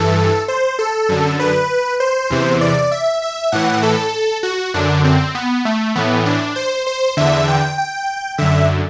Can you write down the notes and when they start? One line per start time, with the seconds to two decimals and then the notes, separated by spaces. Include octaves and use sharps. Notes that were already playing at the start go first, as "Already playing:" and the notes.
Already playing: G2 E3 A4
0.48 C5
0.79 A4
1.09 F#2 D3
1.39 B4
2.00 C5
2.30 E2 C3 E3
2.61 D5
2.91 E5
3.22 E5
3.52 A2 E3 F#5
3.83 A4
4.43 F#4
4.74 F#2 D3 D4
5.04 C4
5.35 B3
5.65 A3
5.95 A2 E3 B3
6.26 D4
6.56 C5
6.87 C5
7.17 E2 D3 E5
7.48 G5
7.78 G5
8.38 F#2 D3 E5